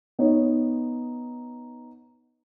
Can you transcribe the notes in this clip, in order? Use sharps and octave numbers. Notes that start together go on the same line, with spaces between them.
B3 D#4 C#5